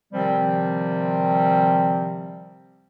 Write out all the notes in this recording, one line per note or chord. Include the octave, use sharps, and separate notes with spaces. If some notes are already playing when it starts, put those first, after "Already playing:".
C3 D#3 F3 G3 C4